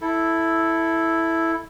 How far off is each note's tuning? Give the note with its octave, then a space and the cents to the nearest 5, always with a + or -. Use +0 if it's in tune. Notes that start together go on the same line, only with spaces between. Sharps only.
E4 +0 A4 +0